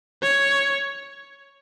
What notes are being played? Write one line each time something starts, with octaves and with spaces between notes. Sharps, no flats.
C#5